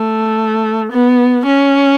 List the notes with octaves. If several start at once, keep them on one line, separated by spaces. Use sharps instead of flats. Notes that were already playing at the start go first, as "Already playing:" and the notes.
Already playing: A3
B3
C#4